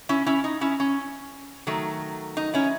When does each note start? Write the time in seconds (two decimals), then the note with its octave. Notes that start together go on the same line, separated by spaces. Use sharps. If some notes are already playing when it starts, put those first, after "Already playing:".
0.09 C#4 E4
0.26 C#4 E4
0.44 D#4
0.61 C#4 E4
0.80 C#4
1.67 D#3 F#3 A3
2.37 D#4
2.54 C#4 E4